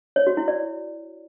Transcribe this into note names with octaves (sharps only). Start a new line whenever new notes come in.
C#5
F#4
E4
D5